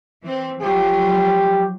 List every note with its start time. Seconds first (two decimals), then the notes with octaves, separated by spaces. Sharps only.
0.24 E3 C4
0.62 F3 F#3 F4 G4